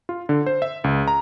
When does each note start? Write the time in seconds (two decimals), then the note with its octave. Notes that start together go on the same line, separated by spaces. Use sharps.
0.09 F4
0.29 D3
0.46 C5
0.62 E5
0.84 C#2
1.08 A#5